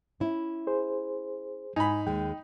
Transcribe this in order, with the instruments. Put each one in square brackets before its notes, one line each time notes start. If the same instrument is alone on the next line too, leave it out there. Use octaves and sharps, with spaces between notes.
[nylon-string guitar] C#4 E4
[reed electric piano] G#4 C5
[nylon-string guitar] G#2 [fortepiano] D#4 B5 [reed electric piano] G#5
[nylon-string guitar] D#2 G#3 [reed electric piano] G5